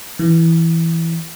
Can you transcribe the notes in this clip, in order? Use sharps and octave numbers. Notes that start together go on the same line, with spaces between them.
E3